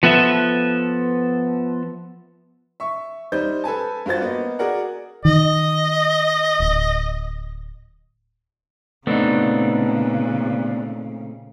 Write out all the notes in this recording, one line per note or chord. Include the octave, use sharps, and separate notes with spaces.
F3 B3 A4 E5
E5 C#6
G3 D#4 C5 G6
A4 B4 G#5 A5
G2 F4 F#4 C5 A6
A#3 B3 D#5
F#4 G#4 A#4 D5 F#5
D#3 D#5
D1
A#2 C#3 A3 B3 C4 D4 D#4